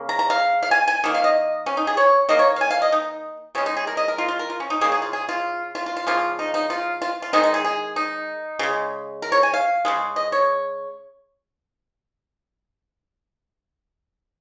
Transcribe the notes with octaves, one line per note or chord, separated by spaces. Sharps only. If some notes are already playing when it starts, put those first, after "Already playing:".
Already playing: C#3 A#3
A#5
A#5
F5
F5
G#5
G#5
D#3 A#3
F5
D#5
C#4
D#4
G#4
C#5
D#3 A#3 D#5
C#5
F5
G#5
F5
D#5
D#4
C#3 G#3 C#4
D#4
G#4
A#4
D#5
A#4
F4
F4
A#4
F4
C#4
D#4
C#3 A#3 G#4
G#4
F4
G#4
F4
F4
F4
F4
C#3 F3 A#3 F4
D#4
D#4
F4
F4
F4
D#3 G#3 D#4
D#4
G#4
G#4
D#4
C#3 G#3
A#4
C#5
G#5
F5
C#3 F3 G#3
D#5
C#5